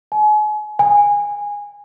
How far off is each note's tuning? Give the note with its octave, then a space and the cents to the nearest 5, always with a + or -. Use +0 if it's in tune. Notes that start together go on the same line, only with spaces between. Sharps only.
G#5 +35
G#5 -15